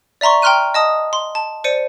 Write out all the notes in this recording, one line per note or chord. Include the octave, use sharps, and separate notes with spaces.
D5 E5 A#5 C6 C#6
G5 A#5 C6 F6 F#6 D#7
D#5 A5 D#6
C6
A5
C5 D5 C#7 D#7